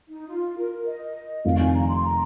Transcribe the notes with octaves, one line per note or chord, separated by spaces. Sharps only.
D#4
F4
A#4
D#5
F1 F2 C3 D#3 F5
G#5
A#5
C6
A#5